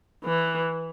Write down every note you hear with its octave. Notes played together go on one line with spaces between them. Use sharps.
E3